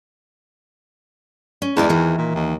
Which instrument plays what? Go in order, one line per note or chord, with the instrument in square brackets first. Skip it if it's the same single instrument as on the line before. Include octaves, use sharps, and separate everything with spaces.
[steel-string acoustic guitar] C#4
[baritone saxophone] E2 [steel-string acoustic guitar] G#3 E4 D5
[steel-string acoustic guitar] D#3 E3
[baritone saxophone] A#2
D#2